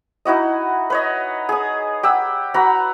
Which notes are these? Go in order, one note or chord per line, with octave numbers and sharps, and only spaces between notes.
D#4 E4 F#4 D#5
B4 C#5 D#5
G#4 D#6
G4 F#5 E6
F#4 B4 A#5 B5